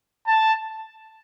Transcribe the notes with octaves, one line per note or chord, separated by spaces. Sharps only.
A5